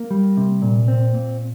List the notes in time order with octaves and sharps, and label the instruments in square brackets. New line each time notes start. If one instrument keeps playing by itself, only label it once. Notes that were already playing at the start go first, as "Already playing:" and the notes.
Already playing: [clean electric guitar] A#3
G3
C3
A#2
C4
A#2